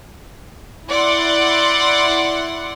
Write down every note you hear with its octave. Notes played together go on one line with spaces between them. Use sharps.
E4 D5 F#5 C6